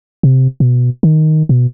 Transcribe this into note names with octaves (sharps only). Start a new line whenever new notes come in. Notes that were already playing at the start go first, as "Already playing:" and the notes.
C3
B2
D#3
B2